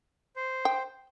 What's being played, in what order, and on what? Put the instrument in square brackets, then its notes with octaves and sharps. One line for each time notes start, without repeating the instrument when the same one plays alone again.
[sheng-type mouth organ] C5
[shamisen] G5